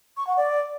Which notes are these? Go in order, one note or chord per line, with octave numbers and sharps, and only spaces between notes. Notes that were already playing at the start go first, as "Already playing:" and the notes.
C#6
F#5
D5